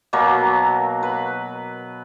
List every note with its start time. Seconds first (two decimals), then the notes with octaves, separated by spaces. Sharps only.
0.13 B2 F#3 A#3
1.03 B4